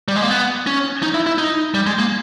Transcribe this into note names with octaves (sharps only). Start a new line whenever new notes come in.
G3
G#3
A#3
B3
C#4
D#4
E4
E4
D#4
G3
G#3
A#3